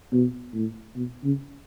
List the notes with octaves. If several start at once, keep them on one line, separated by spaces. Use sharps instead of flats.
B2
A2
B2
C#3